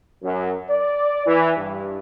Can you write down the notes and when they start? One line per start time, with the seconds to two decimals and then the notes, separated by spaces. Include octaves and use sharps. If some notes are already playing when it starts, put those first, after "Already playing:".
0.23 F#2
0.70 D5
1.26 E3
1.57 G2